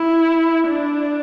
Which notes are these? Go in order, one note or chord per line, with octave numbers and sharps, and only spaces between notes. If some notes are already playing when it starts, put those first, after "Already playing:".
Already playing: E4
D4